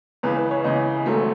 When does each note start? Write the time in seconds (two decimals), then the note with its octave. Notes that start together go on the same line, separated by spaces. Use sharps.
0.23 C#2 C#3 E3 B4
0.37 B4
0.51 C#5
0.64 C#2 C#3 E3 D#5
1.06 G#1 G#2 F#3 A3